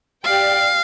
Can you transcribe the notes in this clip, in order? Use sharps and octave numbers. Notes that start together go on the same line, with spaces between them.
G4 D5 F5 G5